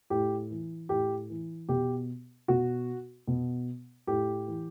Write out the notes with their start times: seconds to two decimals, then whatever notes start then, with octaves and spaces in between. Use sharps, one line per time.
0.10 A2 G4
0.51 E3
0.89 A2 G4
1.30 E3
1.69 B2 G4
2.48 B2 F#4
3.27 B2
4.07 A2 G4
4.48 E3